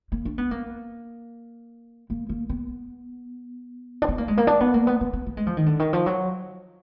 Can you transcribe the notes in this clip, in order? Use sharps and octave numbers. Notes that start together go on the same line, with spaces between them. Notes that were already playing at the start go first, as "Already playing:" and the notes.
A#3
D4
B3
A#3
A#3
A#3
B3
D4
B3
A#3
G#3
A#3
D4
B3
A#3
B3
B3
B3
A#3
G#3
F3
D#3
D3
D#3
F3
F#3